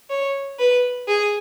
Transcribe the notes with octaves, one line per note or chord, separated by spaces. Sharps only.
C#5
B4
G#4